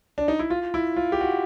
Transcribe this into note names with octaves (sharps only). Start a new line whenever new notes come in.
D4
D#4
E4
F4
E4
F4
G4
F#4